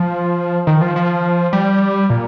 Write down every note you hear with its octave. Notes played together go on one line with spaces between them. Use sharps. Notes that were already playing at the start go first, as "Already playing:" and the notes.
Already playing: F3
D#3
F3
F3
G3
A#2